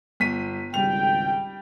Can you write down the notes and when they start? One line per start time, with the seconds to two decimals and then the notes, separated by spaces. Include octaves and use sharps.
0.20 G1 B6 D#7
0.74 G#1 C#2 G3 G5 F7